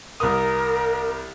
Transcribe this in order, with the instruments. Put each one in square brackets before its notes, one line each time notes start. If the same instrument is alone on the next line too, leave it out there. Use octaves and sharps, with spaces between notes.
[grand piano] C2 D#6 [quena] A#4